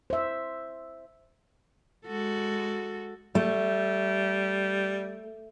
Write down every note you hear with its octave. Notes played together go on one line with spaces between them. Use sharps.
C5 E5
G#3 F#4 A4
G3 A3